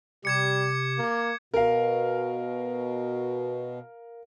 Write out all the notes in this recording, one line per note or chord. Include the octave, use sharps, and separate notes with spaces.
C3 G3 G4 D6 G#6 C#7
A#3
B2 A#4 F5